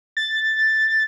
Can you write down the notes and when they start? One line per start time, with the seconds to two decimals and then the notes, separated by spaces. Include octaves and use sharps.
0.17 A6